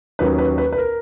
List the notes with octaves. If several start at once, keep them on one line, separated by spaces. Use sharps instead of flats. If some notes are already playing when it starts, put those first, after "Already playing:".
D#2 D#3 F#3 A#3 C#4 B4
B4
B4
B4
A#4